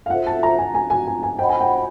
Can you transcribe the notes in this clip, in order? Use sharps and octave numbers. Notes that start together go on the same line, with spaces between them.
F5
F4 A4 C5 E5 F#5
A5
A#5
G#5
G#5
G#5
G#5
G#5
C5 D#5 F#5 G5 B5
G#5
G5